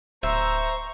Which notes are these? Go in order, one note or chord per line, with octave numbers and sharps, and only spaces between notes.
D1 C5 E5 A#5 C#6